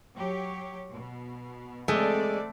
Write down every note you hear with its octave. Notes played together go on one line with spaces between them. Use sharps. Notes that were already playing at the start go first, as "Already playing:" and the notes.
F#3 G4 C#5
B2
G#3 A3 C4 A4 D5